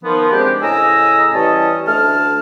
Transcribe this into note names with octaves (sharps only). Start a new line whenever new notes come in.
D#3 F3 B3
G#3 C4 D4 G4
A2 C#3 D#5 G#5 A#5 E6
E3 G3 C#4 D#5 A5
D2 A3 A5 F6